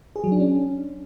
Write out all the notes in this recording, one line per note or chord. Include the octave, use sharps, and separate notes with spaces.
G#4
F#3
D4
C#4